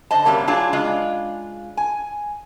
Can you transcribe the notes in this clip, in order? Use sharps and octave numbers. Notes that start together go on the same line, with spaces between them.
D3 C5 D#5 A5
F#2 C3 F#3 G3 A#3
A2 F#3 D4 F4 G#4 A5
C#3 G#3 D4 F4 D#5
G#5